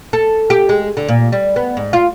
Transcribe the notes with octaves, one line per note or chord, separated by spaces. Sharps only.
A4
G4
G#3
D3
A#2
G3
B3
G#2
F4